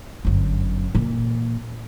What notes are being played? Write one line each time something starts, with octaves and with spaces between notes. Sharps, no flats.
G1 F#2
A#2 E3